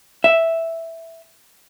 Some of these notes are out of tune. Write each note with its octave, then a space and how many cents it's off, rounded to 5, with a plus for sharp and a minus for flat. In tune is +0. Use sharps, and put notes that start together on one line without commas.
E5 +0